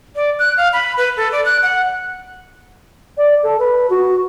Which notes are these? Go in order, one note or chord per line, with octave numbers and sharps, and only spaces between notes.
D5
F#6
F5
B5
B4
A4
D5
F#6
F#5
D5
A4
B4
F#4